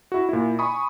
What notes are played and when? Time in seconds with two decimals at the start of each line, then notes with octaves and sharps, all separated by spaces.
0.12 E4 F#4
0.29 A#2 E4
0.59 G#5 B5 C#6 D#6